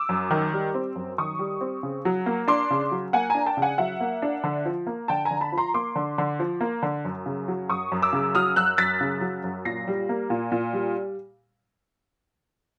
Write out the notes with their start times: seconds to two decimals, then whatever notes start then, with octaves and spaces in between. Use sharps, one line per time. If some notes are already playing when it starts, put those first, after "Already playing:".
Already playing: D6 E6
0.09 F#2
0.31 D#3
0.53 G3
0.74 C4
0.96 F#2
1.18 D#3 C#6 D#6
1.39 G3
1.61 C4
1.83 C#3
2.05 F#3
2.26 A#3
2.48 D4 C6 D6
2.70 C#3
2.91 F#3
3.13 A#3 F#5 G#5
3.30 D4 G#5 A#5
3.46 G5 A5
3.57 C#3
3.62 F#5 G#5
3.78 F#3 E5 F#5
4.00 A#3
4.22 D4
4.44 D3
4.65 F3
4.87 A#3
5.08 D3 G5 A5
5.25 G#5 A#5
5.31 D3
5.41 A5 B5
5.52 F3
5.58 A#5 C6
5.74 A#3 C6 D6
5.95 D3
6.18 D3
6.39 F3
6.61 A#3
6.82 D3
7.05 F#2
7.26 C#3
7.48 F#3
7.69 F#2 C#6 D#6
7.92 F#2
8.02 D6 E6
8.13 C#3
8.35 F#3 D#6 F6
8.56 F#2 E6 F#6
8.78 F#2 A6 B6
9.01 C#3
9.21 F#3
9.44 F#2
9.65 A#2 A#6 C7
9.88 G3
10.09 A#3
10.30 A#2
10.52 A#2
10.73 G3